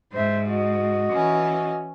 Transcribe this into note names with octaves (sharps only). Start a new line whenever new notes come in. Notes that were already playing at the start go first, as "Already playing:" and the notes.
G#2 C5 E5
F#4 D#5
E3 C#4